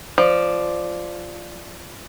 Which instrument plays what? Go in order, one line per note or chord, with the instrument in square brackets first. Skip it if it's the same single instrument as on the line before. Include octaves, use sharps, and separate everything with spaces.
[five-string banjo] F3 [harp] D5